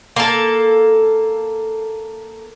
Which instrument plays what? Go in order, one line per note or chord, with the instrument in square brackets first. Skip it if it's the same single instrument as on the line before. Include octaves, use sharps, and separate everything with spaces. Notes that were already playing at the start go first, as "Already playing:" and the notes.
[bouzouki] A#3 A4